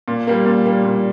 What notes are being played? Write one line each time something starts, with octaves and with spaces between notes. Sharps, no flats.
A#2
G3 A#3
A#2
G3 A#3
A#2